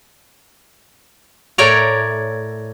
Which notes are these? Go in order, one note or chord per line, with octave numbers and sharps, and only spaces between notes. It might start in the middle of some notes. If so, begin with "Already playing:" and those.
A2 A#4 C#5 D5 A#5